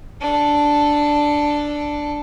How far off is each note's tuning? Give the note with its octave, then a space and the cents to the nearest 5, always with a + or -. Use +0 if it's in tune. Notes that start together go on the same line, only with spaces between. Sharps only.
D4 +0 A4 +0